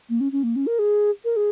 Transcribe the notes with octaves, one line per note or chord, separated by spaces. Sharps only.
A#3
C#4
C#4
A#3
C#4
A#4
G#4
A#4
G#4